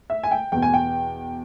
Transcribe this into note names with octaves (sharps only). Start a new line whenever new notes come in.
E5
G#5
G5
E2 B2 G5
G#5
G5